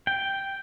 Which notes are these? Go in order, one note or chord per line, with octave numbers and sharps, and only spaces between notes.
G5